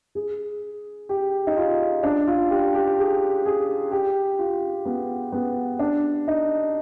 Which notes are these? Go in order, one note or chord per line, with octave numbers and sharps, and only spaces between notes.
G#4
G4
D#4
F4
D4
F4
G4
G4
G#4
G#4
G4
F4
B3
B3
D4
D#4